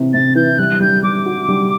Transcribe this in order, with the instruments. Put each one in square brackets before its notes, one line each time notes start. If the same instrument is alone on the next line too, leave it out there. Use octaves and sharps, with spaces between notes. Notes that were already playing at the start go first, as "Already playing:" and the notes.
Already playing: [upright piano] C3 E3
[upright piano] C3 [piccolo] A6
[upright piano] E3 [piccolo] G6
[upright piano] G3 [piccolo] F#6
[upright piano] G3 [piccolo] G6
[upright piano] G3 [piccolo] D6
[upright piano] F#4
G3